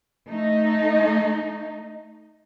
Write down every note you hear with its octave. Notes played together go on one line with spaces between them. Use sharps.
A3 D#4